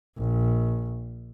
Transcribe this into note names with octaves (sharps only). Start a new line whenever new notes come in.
A#1